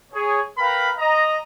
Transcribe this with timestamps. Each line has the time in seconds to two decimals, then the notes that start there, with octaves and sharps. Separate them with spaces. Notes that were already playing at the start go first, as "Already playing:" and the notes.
0.13 G#4 C#5
0.58 A#4 B4 F5 G5 A#5 B5
0.98 D#5 A#5